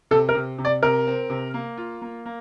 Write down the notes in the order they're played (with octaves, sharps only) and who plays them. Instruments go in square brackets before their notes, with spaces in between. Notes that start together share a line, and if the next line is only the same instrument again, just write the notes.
[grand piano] C3 [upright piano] A4
[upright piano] A#4
[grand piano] C3
C3
[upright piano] D5
[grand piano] C3 [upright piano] A#4
[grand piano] C4
C3
A#3
F4
A#3
A#3